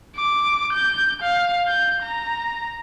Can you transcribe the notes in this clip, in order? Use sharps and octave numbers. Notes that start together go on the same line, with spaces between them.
D6
G6
F5
G6
A#5